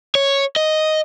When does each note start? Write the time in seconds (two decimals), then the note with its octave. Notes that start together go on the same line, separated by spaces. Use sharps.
0.15 C#5
0.56 D#5